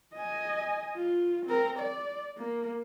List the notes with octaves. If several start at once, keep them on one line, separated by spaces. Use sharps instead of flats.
D#5 G#5
F4
C4 A#4
D5
A#3